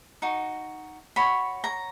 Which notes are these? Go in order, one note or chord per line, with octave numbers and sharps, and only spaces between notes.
D#4 F#4
F#4 C#5 B5
A#5